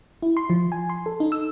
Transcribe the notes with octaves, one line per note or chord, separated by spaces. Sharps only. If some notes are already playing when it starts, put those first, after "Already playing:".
E4
C6
F3
G#5
C6
A4
D#4
E6